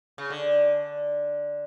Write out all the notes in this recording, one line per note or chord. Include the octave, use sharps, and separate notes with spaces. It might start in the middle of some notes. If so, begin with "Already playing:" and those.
C#3
D3